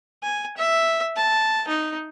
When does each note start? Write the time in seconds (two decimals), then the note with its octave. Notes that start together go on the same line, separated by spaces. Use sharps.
0.23 G#5
0.57 E5
1.16 A5
1.68 D#4